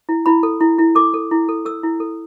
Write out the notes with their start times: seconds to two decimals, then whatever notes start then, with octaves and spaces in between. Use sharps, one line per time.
0.09 E4
0.26 E4 B5
0.43 A4
0.60 E4
0.79 E4
0.95 A4 D6
1.14 A4
1.31 E4
1.49 A4
1.65 A4 E6
1.83 E4
2.00 A4